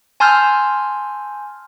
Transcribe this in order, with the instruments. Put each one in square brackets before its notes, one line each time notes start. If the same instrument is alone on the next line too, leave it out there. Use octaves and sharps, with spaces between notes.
[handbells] G#5 A5 C6 E6 F6 G6